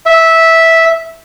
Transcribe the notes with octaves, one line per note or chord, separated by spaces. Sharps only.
E5